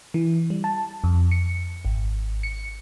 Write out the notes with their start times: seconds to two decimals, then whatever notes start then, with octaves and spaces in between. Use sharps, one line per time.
0.14 E3
0.50 G3
0.64 A5
1.04 F2
1.31 C#7
1.85 G#1
2.43 C#7